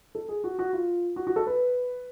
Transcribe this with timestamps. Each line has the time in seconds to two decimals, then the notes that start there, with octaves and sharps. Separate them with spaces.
0.15 A4
0.29 G#4
0.44 F#4
0.59 F#4
0.73 F4
1.16 F#4
1.27 F#4
1.36 A4
1.47 B4